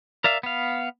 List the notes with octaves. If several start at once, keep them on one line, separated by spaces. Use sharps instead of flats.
A#4 D5 E5 F5
B3 F5